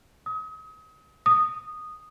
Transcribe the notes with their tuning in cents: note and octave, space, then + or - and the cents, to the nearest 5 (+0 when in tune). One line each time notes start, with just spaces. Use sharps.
D#6 +35
D#6 -10